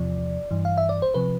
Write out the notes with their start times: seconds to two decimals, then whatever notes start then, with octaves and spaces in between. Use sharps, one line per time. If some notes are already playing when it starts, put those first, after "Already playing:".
Already playing: E2 C3 F3 D5
0.51 G2 E3
0.65 F5
0.78 E5
0.89 D5
1.02 C5
1.14 C3 F3 B4